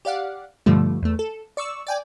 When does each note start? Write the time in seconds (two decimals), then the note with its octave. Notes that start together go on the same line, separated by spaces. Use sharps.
0.05 G4 D5 F5 F#5
0.66 G2 B2 D3 F3 G3 A3
1.03 E2 A3
1.19 A4
1.57 D5 C#6 E6
1.87 D5 G5 G#5